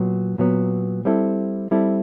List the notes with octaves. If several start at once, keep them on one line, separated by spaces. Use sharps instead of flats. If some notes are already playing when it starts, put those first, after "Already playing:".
Already playing: A#2 F#3 B3
A#2 F#3 B3
G3 C4 E4 A4
G3 C4 E4 A4